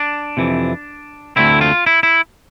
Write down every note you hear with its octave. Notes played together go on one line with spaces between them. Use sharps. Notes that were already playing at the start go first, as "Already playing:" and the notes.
Already playing: D4
F2 C3 E3
D2 D3 A3 C4 E4
F4
E4
E4